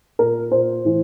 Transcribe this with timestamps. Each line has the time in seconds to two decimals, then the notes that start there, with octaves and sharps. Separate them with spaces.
0.19 A#2 A#4
0.51 A#2 C5
0.85 A2 E3